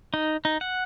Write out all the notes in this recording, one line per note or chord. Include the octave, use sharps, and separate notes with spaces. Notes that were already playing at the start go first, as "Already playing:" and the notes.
D#4
D#4
F#5